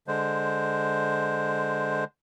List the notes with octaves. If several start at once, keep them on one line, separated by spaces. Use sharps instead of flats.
D3 G#3 C5